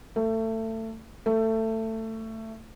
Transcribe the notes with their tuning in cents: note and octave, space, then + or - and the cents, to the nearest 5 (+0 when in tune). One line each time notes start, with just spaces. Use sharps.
A3 +25
A3 +20